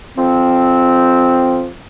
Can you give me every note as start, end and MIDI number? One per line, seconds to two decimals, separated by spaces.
0.17 1.68 41
0.17 1.68 53
0.17 1.68 60